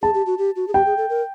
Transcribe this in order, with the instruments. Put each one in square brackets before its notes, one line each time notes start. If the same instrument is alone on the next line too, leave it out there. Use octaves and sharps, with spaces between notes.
[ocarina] G#4 [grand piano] A5
[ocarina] G4
F#4
G4
F#4
G#4
[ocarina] G4 [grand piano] G5
[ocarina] G#4
A4
A#4